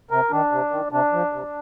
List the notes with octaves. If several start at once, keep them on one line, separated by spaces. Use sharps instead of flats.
C3 A#4
D#3 D4
C3
D#3
C3 D4
F3
C3